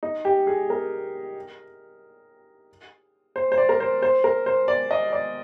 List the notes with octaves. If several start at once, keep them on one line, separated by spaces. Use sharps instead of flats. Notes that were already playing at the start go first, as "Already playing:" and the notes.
D#4
G4
G#4
A#4
C5
C5
D5
A#4
C5
C5
A#4
C5
D5
D#5
D5